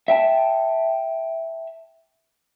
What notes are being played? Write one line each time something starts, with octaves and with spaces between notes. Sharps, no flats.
E5 G5 A5